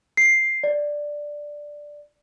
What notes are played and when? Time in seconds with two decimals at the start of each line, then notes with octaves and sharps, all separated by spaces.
0.17 C7
0.64 D5